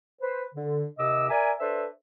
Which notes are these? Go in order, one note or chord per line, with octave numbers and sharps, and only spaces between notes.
B4 C5
D3
D#2 C3 D#5 D6 E6
A#4 D5 E5 G#5
D4 A4 B4 C5 E5